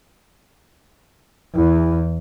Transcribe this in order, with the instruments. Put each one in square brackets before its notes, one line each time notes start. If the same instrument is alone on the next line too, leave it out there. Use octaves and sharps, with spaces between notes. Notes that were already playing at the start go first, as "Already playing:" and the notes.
[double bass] E2 [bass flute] E4